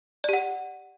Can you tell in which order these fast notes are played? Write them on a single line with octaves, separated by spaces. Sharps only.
D5 G4 F#5